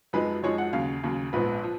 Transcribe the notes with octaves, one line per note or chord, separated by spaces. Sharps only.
F#2 F3 G#3 D#4 B4
F#2 F3 G#3 D#4 C#5
F#5
D#2 C#3 F#3 F5
D#2 C#3 F#3
A#1 G#2 F3 B3 B4
F3